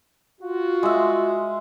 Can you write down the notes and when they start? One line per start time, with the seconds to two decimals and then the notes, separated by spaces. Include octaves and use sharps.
0.41 F4 F#4
0.83 G#3 E5